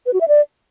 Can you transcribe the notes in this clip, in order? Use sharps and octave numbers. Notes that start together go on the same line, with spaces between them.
B4
F#4
E5
D5